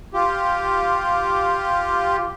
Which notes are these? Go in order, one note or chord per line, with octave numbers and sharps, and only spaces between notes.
F4 G4